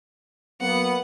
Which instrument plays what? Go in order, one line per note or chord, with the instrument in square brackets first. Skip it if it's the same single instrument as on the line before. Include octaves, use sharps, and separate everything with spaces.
[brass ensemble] F#3 A#3 B3 [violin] F#5